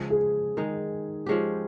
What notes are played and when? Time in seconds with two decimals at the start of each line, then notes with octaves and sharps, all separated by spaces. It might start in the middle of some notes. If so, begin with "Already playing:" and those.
Already playing: C#3 F3 G#3
0.10 G#4
0.57 D#3 G#3 D#4
1.26 F3 G#3 C#4 G4